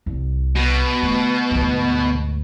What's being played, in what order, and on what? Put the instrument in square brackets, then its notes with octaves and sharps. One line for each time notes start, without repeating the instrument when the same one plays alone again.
[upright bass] C2
[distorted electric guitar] B2
[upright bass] D3 A3
D2 G#2